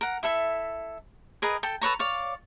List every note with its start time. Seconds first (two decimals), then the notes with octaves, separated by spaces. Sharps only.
0.01 A#4 F#5
0.23 E4 A4 E5
1.42 G#4 A#4 B4 D#5
1.63 A4 G5
1.81 A4 B4 C#5 A#5
1.99 C#5 D5 F5